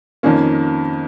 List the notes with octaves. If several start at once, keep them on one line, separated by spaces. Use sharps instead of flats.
F2 D#3 A#3 C#4